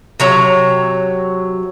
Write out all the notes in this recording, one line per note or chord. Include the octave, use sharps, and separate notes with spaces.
C3 F#3 A#5